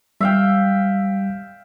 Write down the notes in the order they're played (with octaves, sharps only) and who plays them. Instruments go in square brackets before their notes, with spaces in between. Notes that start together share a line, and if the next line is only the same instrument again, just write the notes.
[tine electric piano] G3 [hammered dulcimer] E5 F5 G5